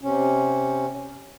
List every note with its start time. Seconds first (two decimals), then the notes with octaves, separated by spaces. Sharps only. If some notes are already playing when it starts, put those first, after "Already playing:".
0.01 C3 C#4